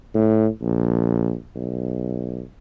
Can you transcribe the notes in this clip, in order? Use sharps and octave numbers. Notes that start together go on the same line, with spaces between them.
A2
A#1
B1